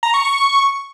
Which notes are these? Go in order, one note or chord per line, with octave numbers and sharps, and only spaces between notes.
A#5
C#6
C#6